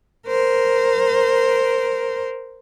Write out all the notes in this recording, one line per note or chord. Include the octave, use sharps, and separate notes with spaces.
A#4 C5